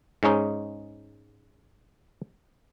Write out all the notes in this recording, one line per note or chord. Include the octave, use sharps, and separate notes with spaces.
G#2 G#3 C#4 D#4